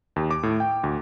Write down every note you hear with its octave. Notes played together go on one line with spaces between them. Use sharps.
D#2
D6
A2
G5
D2